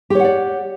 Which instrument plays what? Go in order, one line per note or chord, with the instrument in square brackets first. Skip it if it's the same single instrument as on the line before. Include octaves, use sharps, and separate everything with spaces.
[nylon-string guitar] G4
C#5
F#5
D5